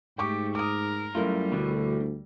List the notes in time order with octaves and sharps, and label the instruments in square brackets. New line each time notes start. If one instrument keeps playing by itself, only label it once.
[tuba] G#2 [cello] A3 G4 [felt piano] G5 C#6 D6
[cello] A#4 [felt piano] D6 D#6
[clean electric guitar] F#2 F4 [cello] G3 [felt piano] A3 E4 A#4
[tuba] D2 [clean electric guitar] B2 D3